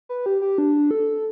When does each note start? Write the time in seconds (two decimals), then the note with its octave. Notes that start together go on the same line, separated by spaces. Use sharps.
0.09 B4
0.26 G4
0.42 G4
0.58 D4
0.91 A4